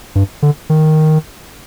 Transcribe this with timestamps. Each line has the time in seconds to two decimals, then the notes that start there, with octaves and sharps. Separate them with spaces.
0.15 G2
0.42 D3
0.70 D#3